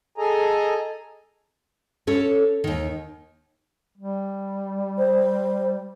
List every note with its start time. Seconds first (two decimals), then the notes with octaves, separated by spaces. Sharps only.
0.18 G#4 A4 D#5 G#5 A#5
2.07 C#4 A4 C#5
2.64 D#2 D#3
3.97 G3
4.98 C5